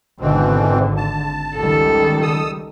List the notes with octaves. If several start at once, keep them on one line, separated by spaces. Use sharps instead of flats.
G#1 B2 D3 E3 C4
A5
C#2 D#3 G3 A4
D#6 E6